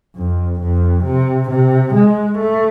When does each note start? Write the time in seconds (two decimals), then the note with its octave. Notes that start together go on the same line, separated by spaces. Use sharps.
0.16 F2
0.61 F2
1.05 C3
1.50 C3
1.94 G#3
2.38 A3